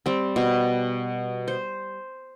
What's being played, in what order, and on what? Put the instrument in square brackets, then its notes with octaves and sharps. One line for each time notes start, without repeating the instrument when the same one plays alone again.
[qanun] G3 C4
B2
C5